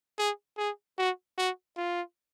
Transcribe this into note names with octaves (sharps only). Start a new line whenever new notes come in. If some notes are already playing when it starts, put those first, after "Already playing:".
G#4
G#4
F#4
F#4
F4